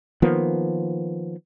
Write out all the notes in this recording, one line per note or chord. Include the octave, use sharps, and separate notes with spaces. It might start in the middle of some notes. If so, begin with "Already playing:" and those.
D#3 F3 A#3 B3